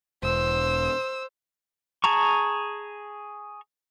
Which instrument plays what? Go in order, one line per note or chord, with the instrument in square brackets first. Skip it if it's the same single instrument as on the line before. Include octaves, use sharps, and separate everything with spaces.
[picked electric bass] E1 [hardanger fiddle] C5 [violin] E6
[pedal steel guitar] G#4 A5 A#5 C#6